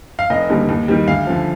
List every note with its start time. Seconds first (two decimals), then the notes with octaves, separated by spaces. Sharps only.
0.19 F5
0.30 F1 D#5
0.50 D#2 D3 G3
0.69 D#2
0.88 D#3 G3
1.07 D2 F5
1.27 D3 F3